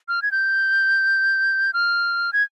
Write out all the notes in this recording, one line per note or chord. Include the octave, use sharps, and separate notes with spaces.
F6
G#6
G6
F6
G#6